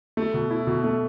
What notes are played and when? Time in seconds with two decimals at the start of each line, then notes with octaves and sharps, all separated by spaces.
0.17 A3
0.34 B2
0.51 E4
0.67 B2
0.84 A3